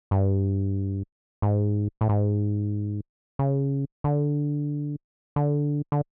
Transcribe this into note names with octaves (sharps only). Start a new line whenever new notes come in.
G2
G#2
A2
G#2
C#3
D3
D3
D3